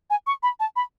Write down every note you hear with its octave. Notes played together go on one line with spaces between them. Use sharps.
G#5
C#6
B5
A5
B5